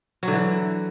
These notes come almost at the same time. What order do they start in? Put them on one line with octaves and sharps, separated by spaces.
F#3 D3 E3